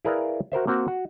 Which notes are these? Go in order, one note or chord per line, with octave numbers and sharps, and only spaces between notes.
E4 G#4 A#4 B4 D5 F5
F#4 A#4 C5 E5
A#3 C4 F#4
F#4